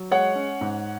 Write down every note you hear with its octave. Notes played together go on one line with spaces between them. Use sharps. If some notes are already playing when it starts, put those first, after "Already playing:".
Already playing: F#3
G#3 C#5 F#5
C#4
G#2